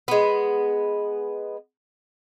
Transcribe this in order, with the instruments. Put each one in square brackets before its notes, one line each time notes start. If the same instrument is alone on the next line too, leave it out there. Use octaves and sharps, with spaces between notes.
[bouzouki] G#3 B3